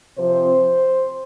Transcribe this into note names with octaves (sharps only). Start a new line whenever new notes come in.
C3 F3 C4 C5